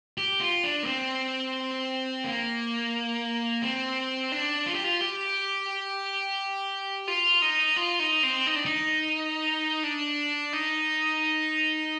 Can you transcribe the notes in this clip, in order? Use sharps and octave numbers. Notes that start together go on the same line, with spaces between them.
G4
F4
D4
A#3
C4
A#3
C4
D4
F4
G4
F4
G4
F4
D#4
F4
D#4
C4
D#4
D4
D#4
D4
D#4